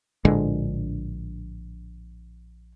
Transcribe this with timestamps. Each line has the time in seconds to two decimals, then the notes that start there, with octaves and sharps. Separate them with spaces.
0.25 A#1 A2 D3 G#3